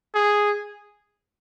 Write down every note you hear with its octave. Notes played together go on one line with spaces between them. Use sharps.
G#4